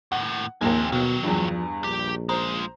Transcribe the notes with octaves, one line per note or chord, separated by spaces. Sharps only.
D#2 A2 F#5
A#1 D#2 A#3 C4 G#5
B2 D#3 F#3
E2 G2 F3
A#1 G4
G#3 F4 C5 A#5